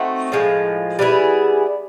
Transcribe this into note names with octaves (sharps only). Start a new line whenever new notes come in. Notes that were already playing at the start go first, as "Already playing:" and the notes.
Already playing: A3 C4 D#4 F#4
A2 F3 G#3
G3 B3 E4 G#4